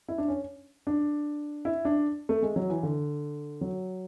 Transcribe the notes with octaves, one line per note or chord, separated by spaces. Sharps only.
E4
D4
C#4
D4
E4
D4
A3
G#3
F#3
E3
D3
F#3